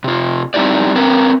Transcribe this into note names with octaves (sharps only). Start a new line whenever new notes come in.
C3 F4
G3 C4 D#4 E4 G4 D5
C4 C#4 A#4 B4